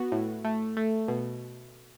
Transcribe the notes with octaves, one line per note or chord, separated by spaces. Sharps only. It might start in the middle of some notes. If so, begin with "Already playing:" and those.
Already playing: B3 F#4
A2
A3
A3
B2